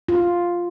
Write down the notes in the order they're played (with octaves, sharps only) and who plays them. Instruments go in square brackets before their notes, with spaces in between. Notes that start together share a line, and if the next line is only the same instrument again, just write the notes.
[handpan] F4